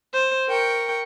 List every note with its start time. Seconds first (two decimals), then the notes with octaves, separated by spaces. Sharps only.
0.13 C5
0.48 A#4 G5 C#6